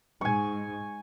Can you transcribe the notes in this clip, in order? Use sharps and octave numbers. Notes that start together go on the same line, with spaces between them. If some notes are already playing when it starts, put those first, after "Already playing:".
G#2 G#5 C#6